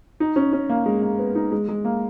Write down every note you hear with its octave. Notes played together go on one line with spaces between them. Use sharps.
D#4
C#4
C#4
A#3
G#3
A#3
B3
D#4
G#3
G#3
A#3